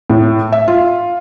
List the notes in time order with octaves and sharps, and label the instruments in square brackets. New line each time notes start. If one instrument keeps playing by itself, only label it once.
[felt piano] A2
E5
F4